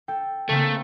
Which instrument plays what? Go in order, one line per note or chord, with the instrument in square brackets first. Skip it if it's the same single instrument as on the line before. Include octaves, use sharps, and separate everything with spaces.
[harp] A4 G5
[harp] C#3 A#3 C4 [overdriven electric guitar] A3